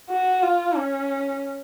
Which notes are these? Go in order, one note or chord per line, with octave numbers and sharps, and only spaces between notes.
F#4
F4
C#4